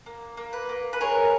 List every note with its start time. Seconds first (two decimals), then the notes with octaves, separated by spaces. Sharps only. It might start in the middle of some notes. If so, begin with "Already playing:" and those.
0.06 A#3
0.37 A#3
0.53 B4
0.69 A#3
0.93 B4
1.00 G#4 A#4 C#5